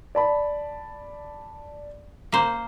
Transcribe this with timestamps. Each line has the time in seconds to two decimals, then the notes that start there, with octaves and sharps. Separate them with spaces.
0.15 D5 A5 B5
2.32 A#3 C5